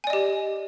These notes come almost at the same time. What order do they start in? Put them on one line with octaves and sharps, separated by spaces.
G#5 D5 D#5 G4